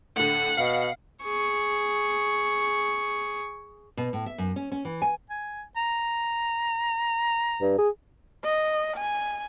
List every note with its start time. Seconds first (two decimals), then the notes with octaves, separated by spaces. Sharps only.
0.16 A2 D3 F#5
0.57 B2 F5
1.23 G#4 C#6
3.97 B2
4.13 A2
4.26 E5
4.38 F#2
4.56 C#4
4.72 C#4
4.85 E3
5.02 G#5
5.30 G#5
5.76 A#5
7.61 G2
7.78 G#4
8.44 D#5
8.97 G#5